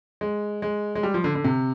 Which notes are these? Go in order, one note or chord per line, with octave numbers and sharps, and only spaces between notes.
G#3
G#3
G#3
G3
F3
D3
D3
C3